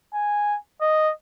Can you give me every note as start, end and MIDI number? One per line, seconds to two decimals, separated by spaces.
0.13 0.57 80
0.81 1.11 75